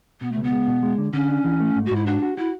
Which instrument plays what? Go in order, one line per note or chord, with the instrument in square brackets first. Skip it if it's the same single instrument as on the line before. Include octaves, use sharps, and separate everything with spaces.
[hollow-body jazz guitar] B2 [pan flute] B3
[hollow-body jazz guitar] C#2 [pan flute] A3
[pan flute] B3
[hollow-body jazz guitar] G#3
B2
G#3
D3
[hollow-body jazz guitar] D3 [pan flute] C#4
[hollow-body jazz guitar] D4
E3
A3
G#2
[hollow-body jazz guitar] G#2 [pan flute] F#4
[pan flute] E4
[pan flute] D4 [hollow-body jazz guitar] F#4
[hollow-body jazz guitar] F#4
[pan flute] E4 [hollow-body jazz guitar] F#4